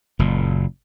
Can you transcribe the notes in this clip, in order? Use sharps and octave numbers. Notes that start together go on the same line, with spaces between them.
F#1 A#2